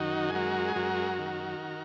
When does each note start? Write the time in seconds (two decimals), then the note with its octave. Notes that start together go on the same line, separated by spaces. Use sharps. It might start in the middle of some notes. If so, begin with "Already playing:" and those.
Already playing: F#2 D#3 D#4 F#4
0.30 G#4
0.35 G#3 F#4 A#4
0.68 G#4
0.76 F#2 F#4 A#4
1.19 D#3